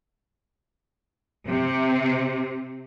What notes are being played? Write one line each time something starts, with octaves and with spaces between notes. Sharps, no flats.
C3